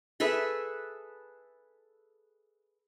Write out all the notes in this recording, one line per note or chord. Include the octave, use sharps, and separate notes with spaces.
G#4 A4 B4 E5